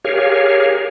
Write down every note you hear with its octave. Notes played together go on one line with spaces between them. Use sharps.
G4 G#4 A#4 C#5 F5